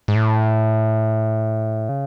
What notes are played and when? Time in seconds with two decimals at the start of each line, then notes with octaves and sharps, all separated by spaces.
0.08 G#2
0.15 A2
1.89 C#3